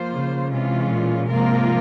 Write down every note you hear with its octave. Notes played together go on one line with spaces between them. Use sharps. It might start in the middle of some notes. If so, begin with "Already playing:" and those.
Already playing: F3 A#3 F4 C5
C#3
C3 E3 G#3 C#4 F4
A#2
G#2 C3 F3 A#3 F4 A#4